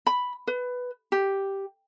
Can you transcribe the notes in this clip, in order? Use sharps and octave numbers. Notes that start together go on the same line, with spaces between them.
B5
B4
G4